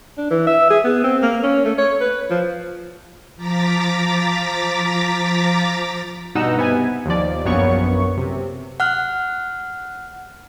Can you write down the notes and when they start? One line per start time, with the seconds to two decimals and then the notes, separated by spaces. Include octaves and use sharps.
0.17 D4
0.30 E3
0.47 E5
0.70 G#4
0.84 B3
1.04 C4
1.22 A#3
1.43 C#4
1.65 A3
1.78 C#5
2.00 B4
2.30 F3
3.36 F3 A#5 D6 A6 B6
6.35 G2 B2 D#4 F#5 E6
6.57 C3 B3 G#5
7.06 D#2 F3 D5
7.45 A#1 F#2 A#2 B3 C#5 C#6
8.17 C3
8.80 F#5 F6 F#6